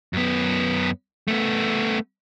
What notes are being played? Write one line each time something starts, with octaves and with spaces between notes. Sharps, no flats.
F#2 B3
A3 B3